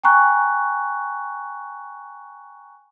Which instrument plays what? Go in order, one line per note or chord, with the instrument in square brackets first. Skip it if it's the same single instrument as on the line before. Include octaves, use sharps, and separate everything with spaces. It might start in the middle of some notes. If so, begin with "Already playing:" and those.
[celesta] G5 G#5 A#5 C#6 F#6